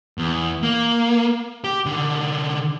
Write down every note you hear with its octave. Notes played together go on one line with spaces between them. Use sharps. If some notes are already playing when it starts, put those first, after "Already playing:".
E2
A#3
G4
D3 D#3